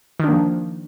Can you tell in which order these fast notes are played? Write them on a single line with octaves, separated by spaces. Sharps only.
D#3 D4 A#3 F3